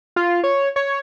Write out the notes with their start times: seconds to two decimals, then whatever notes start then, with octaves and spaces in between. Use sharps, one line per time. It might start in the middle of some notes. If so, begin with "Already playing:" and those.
0.16 F4
0.44 C#5
0.76 C#5